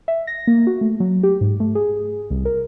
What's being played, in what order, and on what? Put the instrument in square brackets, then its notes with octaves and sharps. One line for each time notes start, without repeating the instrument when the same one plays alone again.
[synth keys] E5
A#6
A#3
F#4
A3
F#3
G4
G#2
A3
G#4
C2
A#4